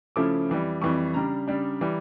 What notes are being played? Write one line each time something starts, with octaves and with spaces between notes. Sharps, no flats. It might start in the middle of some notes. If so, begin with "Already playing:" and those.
C#3 F3 A3 C#4 E4 D6
F2 E3 G3
F2 E3 G3 C#6
C#3 G3 D4 A#5
C#3 G3 D4
E3 G3